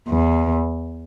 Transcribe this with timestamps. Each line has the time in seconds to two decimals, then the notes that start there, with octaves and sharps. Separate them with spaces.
0.08 E2